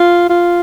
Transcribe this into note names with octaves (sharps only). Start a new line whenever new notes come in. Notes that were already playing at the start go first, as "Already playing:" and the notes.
Already playing: F4
F4